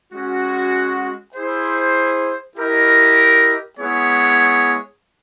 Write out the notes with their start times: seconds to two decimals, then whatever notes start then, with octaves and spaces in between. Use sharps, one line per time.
0.12 G#3 C#4 F#4
1.34 E4 G#4 C5
2.56 E4 G4 A#4 D#5
3.78 G#3 B3 E4 G#4 C#5